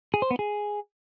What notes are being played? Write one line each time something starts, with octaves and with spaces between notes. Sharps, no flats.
G#4
C5
B3
G#4